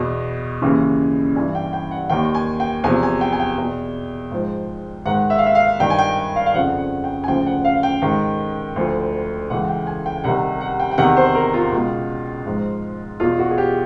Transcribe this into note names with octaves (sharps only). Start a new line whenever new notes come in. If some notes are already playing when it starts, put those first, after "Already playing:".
Already playing: E2 B2
D#2 C#3 E3
G2 E3 G#5
G5
G5
F#5
D#2 D#3 G5
G#5
G5
E2 C3 F3 G#5
G#5
G5
G#5
G5
E2 B2
G#2 F3
G#2 D#3 F#5
E5
F5
E5
F5
G2 D#3 G5
G#5
G5
F5
F5
F2 C#3 F3 F#5
F#5
G5
G#5
D2 C#3 F3 G5
F#5
F5
G5
G#2 D#3
D2 D3 F3
C#2 C#3 E3 F#5
G5
G#5
G5
C2 C3 D#3 F#5
F#5
G5
G5
E2 C3 D#3 F#5
C5
A#4
F4
C#2 B2
G#2 F3
E2 B2 F4
F#4
G#4
G4